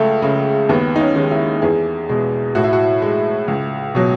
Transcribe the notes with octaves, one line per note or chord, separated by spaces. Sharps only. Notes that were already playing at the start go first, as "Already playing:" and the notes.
Already playing: C#2 A3
C#3 G#3
D#2 B3
D#4
C#4
D#3 G#3
E4
E2 G#4
B2 G#3
A2 F#4
E4
F#4
G#3
C#2
B2 F#3